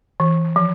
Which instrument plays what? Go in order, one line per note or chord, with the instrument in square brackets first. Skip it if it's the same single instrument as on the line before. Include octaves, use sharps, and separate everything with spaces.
[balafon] E3
F3